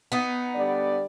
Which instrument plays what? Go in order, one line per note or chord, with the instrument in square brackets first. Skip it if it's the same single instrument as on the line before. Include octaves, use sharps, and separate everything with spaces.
[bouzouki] B3 D#4
[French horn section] D3 G3 D5